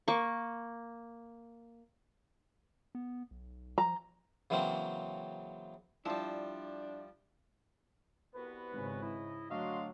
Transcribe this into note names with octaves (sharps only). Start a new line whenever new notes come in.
A#3 C#6
B3
B1
F3 A#5
C#3 E3 F#3 A#3 C4
F3 G3 D4 E4 C5 A5
C2 B3 F#4 B4
G#1 G#2 C#3
E4 D#5
D2 F#3 D4 F#4 D#5 F5 C6